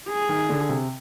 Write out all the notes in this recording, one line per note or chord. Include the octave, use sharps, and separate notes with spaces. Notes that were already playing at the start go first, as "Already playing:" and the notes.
G#4
D#3
D3
C3